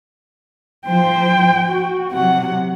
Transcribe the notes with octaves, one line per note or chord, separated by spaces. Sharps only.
F3 C5 G5
F#4
C3 F#3 F#5